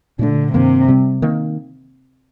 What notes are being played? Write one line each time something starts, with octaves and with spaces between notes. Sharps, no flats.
A#2 D3 A3 D4
G2 C3 D#3 A#3
C3 G3 C4
D#3 A#3